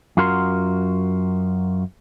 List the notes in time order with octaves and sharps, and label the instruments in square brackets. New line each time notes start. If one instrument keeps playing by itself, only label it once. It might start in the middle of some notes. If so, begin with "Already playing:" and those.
[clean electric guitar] F#2 F4 F#4 A#4 A#5 C6